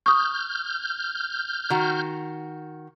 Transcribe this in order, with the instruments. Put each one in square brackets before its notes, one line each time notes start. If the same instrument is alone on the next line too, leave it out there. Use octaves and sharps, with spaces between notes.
[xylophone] C#6 D#6 [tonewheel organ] F6 G6
[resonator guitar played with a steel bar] D#3 F#4